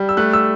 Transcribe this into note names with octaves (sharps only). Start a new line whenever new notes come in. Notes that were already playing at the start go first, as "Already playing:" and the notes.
Already playing: G3
E6
A3 F#6
E6